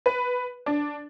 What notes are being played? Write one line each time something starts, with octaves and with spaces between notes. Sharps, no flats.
B4
D4